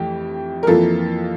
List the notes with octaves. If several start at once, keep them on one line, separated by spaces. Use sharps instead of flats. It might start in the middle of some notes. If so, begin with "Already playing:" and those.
Already playing: F2 E3 A3 G4
A#4
F2 E3 A#3 F4 A4